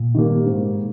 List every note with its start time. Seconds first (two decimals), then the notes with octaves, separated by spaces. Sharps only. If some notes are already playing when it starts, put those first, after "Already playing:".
Already playing: A#2
0.15 D#3 G3 A#3
0.46 G#2